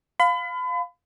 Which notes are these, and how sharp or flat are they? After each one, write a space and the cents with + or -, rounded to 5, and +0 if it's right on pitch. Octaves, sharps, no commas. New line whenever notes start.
F5 +10 B5 +35